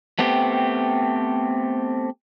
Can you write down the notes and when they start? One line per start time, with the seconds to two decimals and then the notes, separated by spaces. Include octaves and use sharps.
0.19 A3 B3 C4 G4